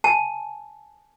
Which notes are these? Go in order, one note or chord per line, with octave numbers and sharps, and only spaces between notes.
G#5 A5